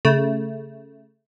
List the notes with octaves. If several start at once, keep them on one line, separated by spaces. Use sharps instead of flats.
C#3 A3